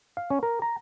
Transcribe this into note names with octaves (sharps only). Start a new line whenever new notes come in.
F5
C#4
A#4
A#5